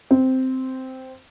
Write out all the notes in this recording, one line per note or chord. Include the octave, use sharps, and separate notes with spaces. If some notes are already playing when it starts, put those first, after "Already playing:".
C4